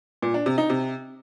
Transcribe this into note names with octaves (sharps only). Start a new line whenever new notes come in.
A#2
D4
C3
D#4
C3